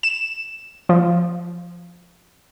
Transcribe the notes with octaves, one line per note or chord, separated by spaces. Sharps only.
E7
F3